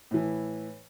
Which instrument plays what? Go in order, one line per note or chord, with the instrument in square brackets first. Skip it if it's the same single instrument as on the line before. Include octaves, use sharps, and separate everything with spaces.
[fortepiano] A2 E3